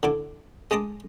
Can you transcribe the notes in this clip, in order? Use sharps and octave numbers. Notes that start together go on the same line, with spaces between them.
D3 E4 D6
G#3 D#5 A5 D6 D#6